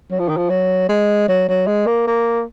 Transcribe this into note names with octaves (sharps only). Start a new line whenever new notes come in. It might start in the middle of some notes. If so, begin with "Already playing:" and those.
F#3
F3
D#3
F3
F#3
G#3
F#3
F#3
G#3
A#3
A#3